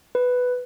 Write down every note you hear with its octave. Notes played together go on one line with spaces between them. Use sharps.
B4